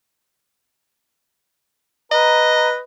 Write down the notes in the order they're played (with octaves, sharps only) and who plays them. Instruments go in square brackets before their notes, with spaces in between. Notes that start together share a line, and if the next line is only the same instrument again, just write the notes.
[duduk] B4 [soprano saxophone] D#5 [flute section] A#5